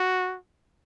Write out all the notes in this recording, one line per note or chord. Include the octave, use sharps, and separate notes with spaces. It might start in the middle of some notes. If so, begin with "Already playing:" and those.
Already playing: F#4